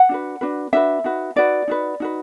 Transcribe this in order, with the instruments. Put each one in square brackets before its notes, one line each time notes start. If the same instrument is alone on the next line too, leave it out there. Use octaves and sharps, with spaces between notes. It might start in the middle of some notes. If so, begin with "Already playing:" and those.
Already playing: [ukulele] F#5
D4 F#4 B4
D4 F#4 B4
D4 F#4 B4 E5
D#4 F#4 B4
D#4 F#4 B4 D5
D#4 F#4 B4
D#4 F#4 B4